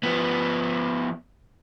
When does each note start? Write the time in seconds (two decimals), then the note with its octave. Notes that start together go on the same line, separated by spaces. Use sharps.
0.03 F3 B3